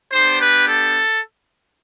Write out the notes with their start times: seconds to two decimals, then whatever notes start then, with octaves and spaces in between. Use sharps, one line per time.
0.12 B3 D4 G4 C5
0.40 B4
0.69 A4